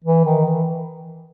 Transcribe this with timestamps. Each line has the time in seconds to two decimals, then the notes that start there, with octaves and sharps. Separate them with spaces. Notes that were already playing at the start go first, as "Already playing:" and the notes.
0.05 E3
0.25 D#3
0.46 E3